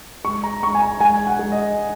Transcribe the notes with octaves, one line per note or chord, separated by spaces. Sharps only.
G#3 C#6
A#5
G#3 C#6
G#5
A#5
G#3 G#5
F#5
G#3
D#5